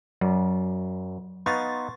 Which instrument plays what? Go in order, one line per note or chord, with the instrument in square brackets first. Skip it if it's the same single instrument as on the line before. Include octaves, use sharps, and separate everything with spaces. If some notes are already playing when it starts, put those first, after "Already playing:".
[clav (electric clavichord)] F#2 [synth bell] F#3
[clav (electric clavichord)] B3 D#4 F5 [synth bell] C6 C#6 A6